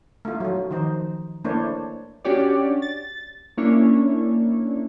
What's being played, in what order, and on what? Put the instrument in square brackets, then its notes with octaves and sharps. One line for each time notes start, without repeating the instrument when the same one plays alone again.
[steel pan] A3 D#4 F4
F#3 F4
D#3 F3 D#4 C5
A3 A#3 D4 E4 C5 C#5
[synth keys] C#4 D4 F#4 G4 C#5 D5
A6
A#3 C#4 D4 E4 C#5